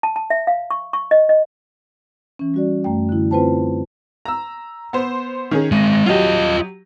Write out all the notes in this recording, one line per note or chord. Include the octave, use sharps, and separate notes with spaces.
A5
A5
E5
F5
C#6
C#6
D#5
D#5
E3 C#4
G3 F#4 D5
F#2 A3 G5
D3 E4
C4 F4 B4 C5 G5 A5
A#5 E6
B3 C5
D#3 C#4 G#4
G#3 C4 A#6 D#7
F#3 F4 G4 D#5